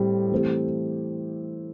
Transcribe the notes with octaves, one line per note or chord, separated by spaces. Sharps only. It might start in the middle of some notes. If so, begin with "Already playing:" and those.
Already playing: A2 G3 C4 G4
E3 A3 C4 G4